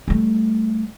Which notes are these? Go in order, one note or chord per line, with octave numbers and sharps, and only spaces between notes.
G3 A3